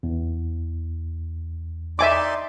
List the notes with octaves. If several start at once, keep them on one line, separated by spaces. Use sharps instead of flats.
E2
D#4 D5 E5 G#5 C6 D6